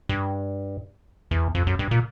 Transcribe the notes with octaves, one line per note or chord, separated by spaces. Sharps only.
G2
E2
F2
F#2
G2
A#2